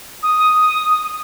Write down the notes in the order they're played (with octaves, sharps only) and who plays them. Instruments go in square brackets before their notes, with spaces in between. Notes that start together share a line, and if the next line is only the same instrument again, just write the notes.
[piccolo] D#6